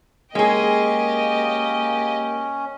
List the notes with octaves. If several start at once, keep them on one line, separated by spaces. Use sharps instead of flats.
G#3 A#3 C#4 G4 G#4 D#5